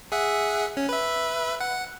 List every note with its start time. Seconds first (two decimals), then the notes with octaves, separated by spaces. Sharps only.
0.12 G#4 E5 F#5
0.77 C#4
0.89 B4 E5
1.60 F#5